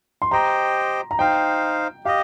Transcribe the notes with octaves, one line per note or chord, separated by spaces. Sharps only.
C6
G4 C5 D#5 G5 A#5
A#5
D#4 C5 F5 G5
G4 D#5 F5